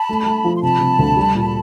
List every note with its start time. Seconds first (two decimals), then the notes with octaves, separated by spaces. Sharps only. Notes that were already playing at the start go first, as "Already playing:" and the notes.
Already playing: A5 B5
0.09 A3
0.26 A3
0.44 F3
0.55 C6
0.62 C3 A5 B5
0.81 C3
0.99 D2
1.17 G3
1.35 A#2